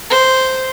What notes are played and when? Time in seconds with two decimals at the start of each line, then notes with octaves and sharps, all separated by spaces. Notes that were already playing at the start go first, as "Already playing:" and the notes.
0.10 C5